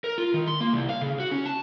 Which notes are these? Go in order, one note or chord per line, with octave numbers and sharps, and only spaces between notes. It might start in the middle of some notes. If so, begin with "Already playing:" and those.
A#4
F4
D#3
C6
A#3
C2
F5
C#3
F#4
C#4
A5